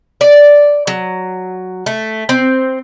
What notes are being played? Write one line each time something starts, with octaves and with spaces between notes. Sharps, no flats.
D5
F#3
A3
C4